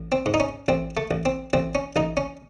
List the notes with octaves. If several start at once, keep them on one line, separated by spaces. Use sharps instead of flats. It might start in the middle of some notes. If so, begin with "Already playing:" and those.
Already playing: A1
C4
G#2
D#4
C#4
A1 C4
A3
A1
C4
A1 C4
C#4
A1 D#4
C#4